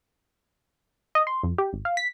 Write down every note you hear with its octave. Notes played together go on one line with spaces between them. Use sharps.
D#5
C6
F2
G4
G#1
F5
B6